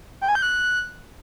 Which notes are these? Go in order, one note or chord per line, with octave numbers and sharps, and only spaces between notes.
G5
G#5
G6
F#6